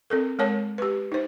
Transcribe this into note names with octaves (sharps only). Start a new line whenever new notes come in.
C4 A4 A#4
G#3 A#4 C#5 A5
G4 B4
D#4 C5